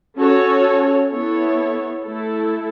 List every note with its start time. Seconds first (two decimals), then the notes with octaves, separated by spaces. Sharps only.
0.17 C#4 F#4 A4 C#5
1.11 B3 E4 A4 C#5
2.04 A3 E4 A4